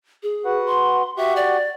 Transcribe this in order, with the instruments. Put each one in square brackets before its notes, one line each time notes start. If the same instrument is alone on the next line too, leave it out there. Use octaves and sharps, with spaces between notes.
[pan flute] G#4
[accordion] F#4 B4 F#5
[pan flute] C6
[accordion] F#4 G4 F#5 [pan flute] E5
[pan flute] D5